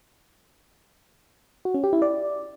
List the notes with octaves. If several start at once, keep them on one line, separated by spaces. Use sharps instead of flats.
F#4
C#4
G4
E4
D5